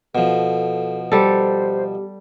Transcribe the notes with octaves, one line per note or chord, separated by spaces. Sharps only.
B2 F3 A4
G3 G4 A4 C5